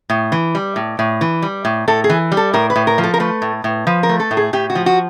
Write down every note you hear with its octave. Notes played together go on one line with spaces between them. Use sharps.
A2
E3
G3
A2
A2
E3
G3
A2
A2 A4
G#4
E3
G3
A4
A2 A#4
B4
A2
A#4
F3
A4
A#4
A3 B4
A2
A2
F3 B4
A#4
A3
A4
A2
G#4
A2 G4
F#4
F3
F#4